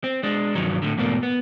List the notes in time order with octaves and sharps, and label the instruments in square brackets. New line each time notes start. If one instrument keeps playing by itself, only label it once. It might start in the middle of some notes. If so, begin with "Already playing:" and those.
[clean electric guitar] C4
G#3 D4
G2 C3 D#3 F3 F#3
A2 D3
E2 G#2 B2 A3 A#3
B3